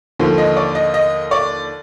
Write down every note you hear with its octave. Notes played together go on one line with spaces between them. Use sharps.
D#2 D3 F3
D#5
D5
D#5
D#5
D5